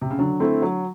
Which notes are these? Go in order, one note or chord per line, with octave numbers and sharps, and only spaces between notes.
C3
C#3
D3 F#3
A3 C4 E4
F#3